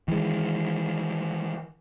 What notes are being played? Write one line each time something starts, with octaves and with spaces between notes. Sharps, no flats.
D#3 E3 G#3